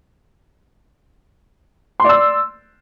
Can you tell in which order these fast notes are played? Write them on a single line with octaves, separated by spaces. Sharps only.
C6 D5 E6